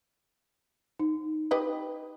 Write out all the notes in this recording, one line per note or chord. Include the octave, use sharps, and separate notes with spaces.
D#4
G4 B4 D#5